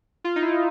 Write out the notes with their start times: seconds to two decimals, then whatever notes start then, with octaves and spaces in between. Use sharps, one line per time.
0.24 F4
0.36 D#4
0.42 E4